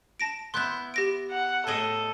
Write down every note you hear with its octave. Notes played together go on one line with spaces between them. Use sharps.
A5 A#6 D7
B3 E4 C6 F#6 G6
G4 A#6 D7
F#5
A2 G#4 A4 D#5